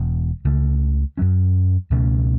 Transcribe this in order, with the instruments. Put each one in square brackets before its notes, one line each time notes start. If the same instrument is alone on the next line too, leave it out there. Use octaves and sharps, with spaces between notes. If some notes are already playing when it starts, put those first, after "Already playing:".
Already playing: [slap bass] E1 E2 B2
C#2 C#3 A3
F#2 F#3 C#4
C#2 B2 A3 C#4